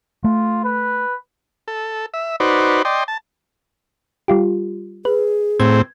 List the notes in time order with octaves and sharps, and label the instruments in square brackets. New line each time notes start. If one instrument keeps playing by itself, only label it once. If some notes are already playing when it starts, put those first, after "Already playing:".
[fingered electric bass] A3 [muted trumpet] F4
[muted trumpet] B4
[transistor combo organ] A4
E5
D#4 F#4 B4 C5 D5
D5 D#5 G5 C6
A5
[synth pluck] G3 F4 G4
[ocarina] G#4 [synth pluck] B4
[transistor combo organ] A2 C4 [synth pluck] G#6